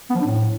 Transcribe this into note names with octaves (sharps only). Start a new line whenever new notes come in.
B3
F3
D4
A2